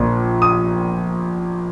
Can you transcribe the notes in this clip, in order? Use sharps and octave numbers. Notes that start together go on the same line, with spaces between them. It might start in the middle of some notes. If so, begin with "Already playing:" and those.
Already playing: A#1 A#2
D#6